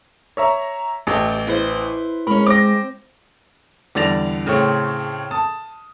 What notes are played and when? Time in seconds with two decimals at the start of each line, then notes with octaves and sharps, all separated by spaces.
0.37 C#5 E5 A#5
1.07 A1 G4 A4 E5
1.47 E4 B4 C5
2.27 G#3 C#4 A#4 B5
2.47 C4 D6 A#6
3.95 E2 D3 G3 A6 A#6 F7
4.46 A2 C#3 A3 C4 C#5
5.31 A5 D#6